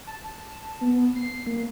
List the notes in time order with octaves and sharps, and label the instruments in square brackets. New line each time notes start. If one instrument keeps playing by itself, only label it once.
[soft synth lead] A5
B3
C7
A#3